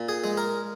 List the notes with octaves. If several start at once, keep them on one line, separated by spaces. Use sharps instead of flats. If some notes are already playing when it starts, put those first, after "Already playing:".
Already playing: A#2
G#4
G#3
A#4